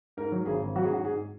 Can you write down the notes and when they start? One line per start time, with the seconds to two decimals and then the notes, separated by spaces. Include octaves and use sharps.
0.17 G#2 A#4
0.32 F#3
0.46 G#1 G#4
0.61 G#1
0.76 F#3 F#4
0.83 G#4
0.90 G#2 F#4
1.05 G#2 G#4